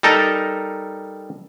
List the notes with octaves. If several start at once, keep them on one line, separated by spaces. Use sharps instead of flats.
G3 D#4 A4 A#4 A#5